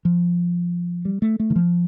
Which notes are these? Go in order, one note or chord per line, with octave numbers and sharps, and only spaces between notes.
F3
G3
A3
A3
D#3
F3